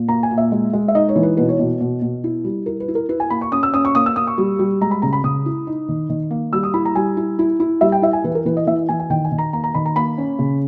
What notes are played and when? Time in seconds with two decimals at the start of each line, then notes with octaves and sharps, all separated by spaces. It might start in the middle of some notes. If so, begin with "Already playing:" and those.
Already playing: A#2
0.08 A#3 A#5
0.23 G#5
0.31 A#2
0.38 E5
0.52 G#3
0.73 G#3
0.88 E5
0.95 D#4 D#5
1.09 C#5
1.15 E3
1.23 B4
1.37 B2 B4
1.49 C#5
1.59 B2
1.81 B2
2.02 B2
2.24 E4
2.44 G3
2.66 E4 A#4
2.80 B4
2.88 E4
2.95 A#4
3.09 E4 B4
3.20 G#5
3.30 A#3 B5
3.41 C#6
3.52 C#4 D#6
3.63 E6
3.74 C#4 D#6
3.85 C#6
3.95 A#3 D#6
4.06 E6
4.16 A#3 D#6
4.27 C#6
4.38 G3
4.59 G3
4.81 G#3 A#5
4.91 B5
5.02 C#3 A#5
5.13 B5
5.23 C#3 D#6
5.46 E4
5.67 D#4
5.88 D#3
6.09 D#3
6.31 A#3
6.53 G3 E6
6.63 D#6
6.74 E4 B5
6.85 A#5
6.95 G3 G#5
7.17 E4
7.39 E4
7.60 E4
7.81 G3 E5
7.92 G5
8.02 E4 E5
8.13 G#5
8.24 E3 B4
8.35 A#4
8.45 E3 B4
8.57 D#5
8.67 E3 E5
8.89 E3 G#5
9.00 G#5
9.10 D#3 G5
9.25 G#5
9.32 D#3
9.38 A#5
9.53 A#3 A#5
9.64 A#5
9.74 D#3 B5
9.85 A#5
9.96 A#3 B5
10.18 C#4
10.39 C#3